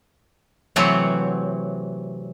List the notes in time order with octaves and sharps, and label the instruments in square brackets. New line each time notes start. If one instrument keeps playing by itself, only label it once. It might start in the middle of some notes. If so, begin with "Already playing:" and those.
[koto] C3 E3 F#3 A3 C4 F#5